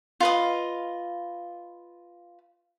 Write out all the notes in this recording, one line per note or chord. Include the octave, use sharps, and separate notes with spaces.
F4 B4 D#5